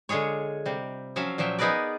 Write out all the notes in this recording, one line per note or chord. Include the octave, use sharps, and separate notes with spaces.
D3 G#3 F4 G#4 C#5
C3 G3
F3 F#3 C#4 E5 F5
A#2 F3 F#3 E5 G5
B3 D#4 G#4 A#4 B4 D5